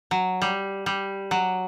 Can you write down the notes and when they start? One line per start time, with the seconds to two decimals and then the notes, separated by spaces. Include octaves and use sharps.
0.11 F#3
0.42 G3
0.86 G3
1.31 F#3